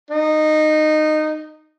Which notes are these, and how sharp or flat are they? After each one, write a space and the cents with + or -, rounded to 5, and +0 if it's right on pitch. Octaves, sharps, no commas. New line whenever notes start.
D#4 -15